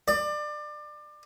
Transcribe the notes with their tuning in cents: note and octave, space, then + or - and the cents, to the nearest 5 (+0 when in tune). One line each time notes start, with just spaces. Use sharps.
D5 +25